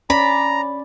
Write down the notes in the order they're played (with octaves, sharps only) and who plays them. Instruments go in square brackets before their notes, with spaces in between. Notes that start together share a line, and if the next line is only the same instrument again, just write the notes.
[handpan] C#4 D5 [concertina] A#5 [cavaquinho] B5